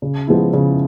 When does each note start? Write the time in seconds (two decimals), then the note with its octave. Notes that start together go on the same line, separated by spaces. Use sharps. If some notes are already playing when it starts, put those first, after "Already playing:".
0.02 C#3
0.27 F3 G#3 B3 E4
0.53 C#3